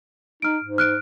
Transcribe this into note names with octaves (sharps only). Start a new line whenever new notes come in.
D#4 F6 D7
G#2
F6 F#6 D7